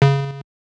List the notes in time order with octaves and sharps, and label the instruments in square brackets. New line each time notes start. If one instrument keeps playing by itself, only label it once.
[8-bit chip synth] C#3